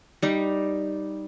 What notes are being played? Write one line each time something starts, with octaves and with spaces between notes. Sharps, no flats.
G3 D#4